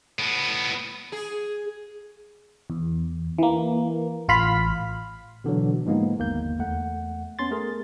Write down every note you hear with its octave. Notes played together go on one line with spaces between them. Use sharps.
A2 B3
G#4
E2
E3 A#3
A1 F4 F5 B5 B6
B2 D3 E3 F#3
G#2 F3 G#3 A#3 B3
G1 D#2 A#3 G6
E2 A3 F#5
B3 C#4 C6 A6
A3 G#4 A#4